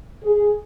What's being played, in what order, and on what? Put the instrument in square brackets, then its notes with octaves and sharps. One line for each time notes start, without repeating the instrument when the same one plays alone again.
[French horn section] G#4